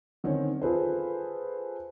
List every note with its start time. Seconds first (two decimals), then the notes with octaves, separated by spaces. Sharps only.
0.24 D3 D#3 C4 C#4
0.62 F4 G#4 A4 B4 C5